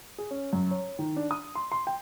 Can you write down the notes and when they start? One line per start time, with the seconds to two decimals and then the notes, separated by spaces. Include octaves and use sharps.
0.18 G#4
0.31 C#4
0.53 F#2
0.71 C#5
0.99 D#3
1.16 D4
1.31 D#6
1.55 C6
1.72 C6
1.87 G5